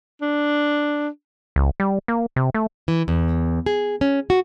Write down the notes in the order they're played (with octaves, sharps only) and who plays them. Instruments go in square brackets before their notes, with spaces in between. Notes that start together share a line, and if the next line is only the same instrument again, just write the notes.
[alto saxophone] D4
[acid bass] C#2
G3
A#3
C3
A3
[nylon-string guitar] E3
E2
G#4
C#4
F#4